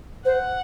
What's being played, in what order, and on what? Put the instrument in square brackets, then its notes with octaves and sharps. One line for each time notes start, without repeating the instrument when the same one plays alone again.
[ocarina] C5 [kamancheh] F#5